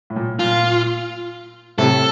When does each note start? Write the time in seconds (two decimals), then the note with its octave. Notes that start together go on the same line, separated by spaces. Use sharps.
0.10 A2
0.16 A#2
0.39 A#2 F4
1.78 A2 C3 A4